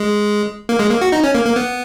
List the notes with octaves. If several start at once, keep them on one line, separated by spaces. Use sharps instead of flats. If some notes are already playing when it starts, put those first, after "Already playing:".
Already playing: G#3
A#3
G#3
A#3
F#4
D#4
C#4
A#3
A#3
B3